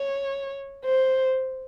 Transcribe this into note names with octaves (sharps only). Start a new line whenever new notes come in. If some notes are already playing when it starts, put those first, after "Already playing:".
Already playing: C#5
C5